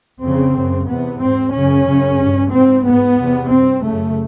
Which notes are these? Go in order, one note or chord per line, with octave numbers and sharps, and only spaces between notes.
F2 C#3 C4
F#2 C#3
E2 C3 B3
G#2 C4
F#2 C#3 C#4
F#2 C#3
G2
G#2 C4
G#2 B3
E2 C3
G2 C4
F#2 C#3 A3